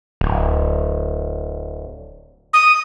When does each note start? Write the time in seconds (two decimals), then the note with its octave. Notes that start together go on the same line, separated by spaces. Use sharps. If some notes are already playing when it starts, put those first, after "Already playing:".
0.21 D1
2.53 D#6